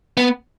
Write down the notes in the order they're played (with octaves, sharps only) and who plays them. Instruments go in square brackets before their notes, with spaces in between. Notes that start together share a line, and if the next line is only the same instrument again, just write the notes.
[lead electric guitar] B3